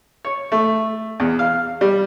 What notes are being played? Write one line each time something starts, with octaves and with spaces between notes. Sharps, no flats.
C#5
A3
E2
F5
G3